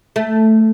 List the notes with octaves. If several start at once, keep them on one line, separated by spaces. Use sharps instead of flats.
A3